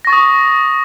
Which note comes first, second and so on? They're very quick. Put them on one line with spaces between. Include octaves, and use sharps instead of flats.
A#6 C#6 A6 D#6